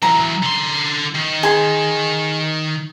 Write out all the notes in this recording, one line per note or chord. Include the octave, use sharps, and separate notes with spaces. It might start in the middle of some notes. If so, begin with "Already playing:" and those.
E3 F#3 A#5
D3 C6
D#3
G#4 C6